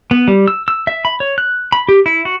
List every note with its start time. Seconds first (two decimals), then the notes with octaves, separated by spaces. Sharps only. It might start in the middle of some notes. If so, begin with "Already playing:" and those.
0.11 B3
0.28 G3
0.48 E6
0.68 E6
0.87 E5
1.05 B5
1.20 C#5
1.38 F#6
1.72 B5
1.89 G4
2.06 E4
2.25 F#4